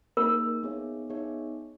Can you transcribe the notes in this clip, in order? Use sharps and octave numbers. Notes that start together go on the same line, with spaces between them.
A#3 D#4 G#4 A#4
B3 D#4 G#4 C#5 E5
B3 D#4 G#4 C#5 E5